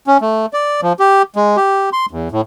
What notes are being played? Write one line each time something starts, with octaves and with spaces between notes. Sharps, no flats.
C#4
A3
D5
F3
G4
G#3
G4
C6
E2
A2